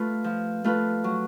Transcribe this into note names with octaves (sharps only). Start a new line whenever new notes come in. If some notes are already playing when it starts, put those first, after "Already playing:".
Already playing: A3 F4 B4
F3
A3 F4 B4
F#3